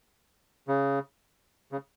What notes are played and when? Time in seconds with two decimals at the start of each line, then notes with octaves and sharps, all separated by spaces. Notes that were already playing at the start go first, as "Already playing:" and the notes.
0.68 C#3
1.72 C#3